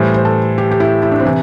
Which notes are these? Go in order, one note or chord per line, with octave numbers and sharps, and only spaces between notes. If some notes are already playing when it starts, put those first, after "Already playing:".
Already playing: A2 E3 G3 C5
C5
A4
G4
G4
E4
E4
D4
C4
C3 E3